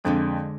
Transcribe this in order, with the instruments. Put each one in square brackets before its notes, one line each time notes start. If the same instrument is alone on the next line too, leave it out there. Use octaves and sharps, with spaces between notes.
[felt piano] F2 [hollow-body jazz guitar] D3 G#3 D4